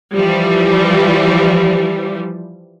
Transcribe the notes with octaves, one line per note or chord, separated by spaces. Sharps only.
E3 F3 G3